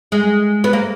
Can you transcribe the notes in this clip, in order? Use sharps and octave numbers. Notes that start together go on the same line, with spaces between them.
G#3
B3
A#3